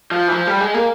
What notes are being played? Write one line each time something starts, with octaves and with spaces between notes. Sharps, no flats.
F3
E3
F3
G3
G#3
A#3